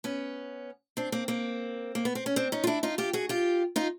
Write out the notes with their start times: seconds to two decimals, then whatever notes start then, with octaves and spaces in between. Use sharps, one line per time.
0.04 B3 C#4
0.97 C4 D4
1.12 A#3 C4
1.28 A#3 C4
1.95 A#3
2.05 B3
2.15 C4
2.26 C#4
2.36 C4 D4
2.52 C#4 D#4
2.64 F4
2.67 D4 E4
2.83 D#4 F4
2.98 F4 G4
3.13 F#4 G#4
3.29 F4 G4
3.76 D#4 F4